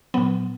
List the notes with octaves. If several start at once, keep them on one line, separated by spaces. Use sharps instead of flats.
A#2 F#3 B3